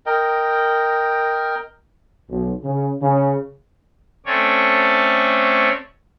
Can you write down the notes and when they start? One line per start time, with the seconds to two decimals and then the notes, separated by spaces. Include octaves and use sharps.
0.06 A#4 D#5 G5
2.31 B1
2.64 C#3
3.02 C#3
4.26 A3 C4 C#4 C#5 D5